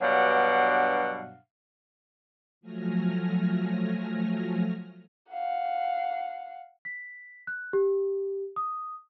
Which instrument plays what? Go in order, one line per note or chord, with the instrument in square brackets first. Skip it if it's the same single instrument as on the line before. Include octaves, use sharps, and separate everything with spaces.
[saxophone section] G2 B2 F#3 D4 F5 F#5
[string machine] F3 F#3 A3 G#5 F6 A#6
[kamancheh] F5 F#5
[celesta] B6
F#6
G4
D#6